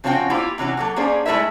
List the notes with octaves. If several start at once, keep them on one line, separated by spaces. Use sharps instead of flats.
C#3 F3 C4 C#4 F#4 G5
A#3 E4 F4 G4
C3 E3 C#4 F#4
F#3 A#3 A4
A#3 C#4 D4 G#4 C5
G#3 A3 E4 A#4 E5